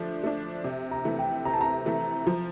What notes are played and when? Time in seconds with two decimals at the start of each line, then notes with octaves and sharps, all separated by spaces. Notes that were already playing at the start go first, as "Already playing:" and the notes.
Already playing: F3 A3 D4
0.23 A3 D4
0.64 C3
0.91 A#5
1.05 E3 A3
1.19 G5
1.45 C3 A#5
1.54 A5
1.61 A#5
1.86 E3 A3
2.27 F3 A#5